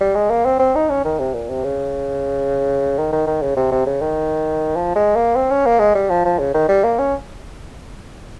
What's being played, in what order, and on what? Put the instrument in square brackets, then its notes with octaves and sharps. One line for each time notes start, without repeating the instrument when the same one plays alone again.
[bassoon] G3
G#3
A#3
C4
C4
D#4
C#4
D#3
C3
A#2
C3
C#3
D#3
D#3
D#3
C#3
C3
C3
C#3
D#3
F3
G#3
A#3
C4
C#4
A#3
G#3
G3
F3
F3
C#3
D#3
G3
A#3
C#4